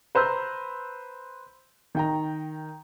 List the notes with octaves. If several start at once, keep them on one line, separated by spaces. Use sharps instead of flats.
B4 C5 A#5 E6 G6
D#3 G5 A#5